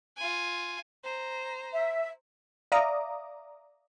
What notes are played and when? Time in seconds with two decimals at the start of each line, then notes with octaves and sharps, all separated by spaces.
0.17 F4 G#5
1.04 C5 A#5
1.73 E5
2.72 D5 E5 F5 A#5 D6 D#6